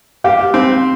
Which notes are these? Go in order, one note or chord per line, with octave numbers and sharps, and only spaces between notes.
G4 F5
C4